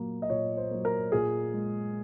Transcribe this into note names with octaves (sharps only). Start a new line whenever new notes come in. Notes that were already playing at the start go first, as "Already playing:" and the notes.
Already playing: A#2 F#3 A#3
D#5
A#2 C#5
C5
F#3 A#3
A#4
A#2 G#4
G#3